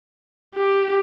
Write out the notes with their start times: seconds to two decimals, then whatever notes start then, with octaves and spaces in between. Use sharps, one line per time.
0.55 G4